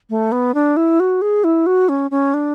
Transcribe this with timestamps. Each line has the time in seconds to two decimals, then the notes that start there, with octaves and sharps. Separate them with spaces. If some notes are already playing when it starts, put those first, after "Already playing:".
0.10 A3
0.32 B3
0.54 D4
0.77 E4
1.00 F#4
1.22 G#4
1.44 E4
1.66 F#4
1.89 C#4
2.11 C#4
2.34 D4